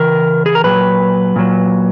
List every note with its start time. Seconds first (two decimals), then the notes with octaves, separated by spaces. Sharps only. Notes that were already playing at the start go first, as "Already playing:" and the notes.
Already playing: C#3 E3 A#4
0.46 G#4
0.55 A#4
0.64 A#2 F#3 B4
1.36 A#2 F#3